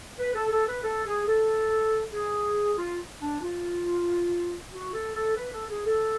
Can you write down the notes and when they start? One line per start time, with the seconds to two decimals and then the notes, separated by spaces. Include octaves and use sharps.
0.19 B4
0.35 A4
0.51 A4
0.68 B4
0.84 A4
1.06 G#4
1.27 A4
2.13 G#4
2.77 F4
3.21 D4
3.42 F4
4.72 F#4
4.93 A4
5.15 A4
5.37 B4
5.52 A4
5.69 G#4
5.85 A4